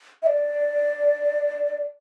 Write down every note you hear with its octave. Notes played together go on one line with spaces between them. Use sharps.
E5
D5